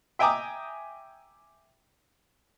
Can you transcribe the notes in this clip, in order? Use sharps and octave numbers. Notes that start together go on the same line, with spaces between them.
E5 G5 G#5 A#5 D6 D#6